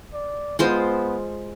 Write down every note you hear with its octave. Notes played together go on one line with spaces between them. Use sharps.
D5
G#3 B3 F4 C5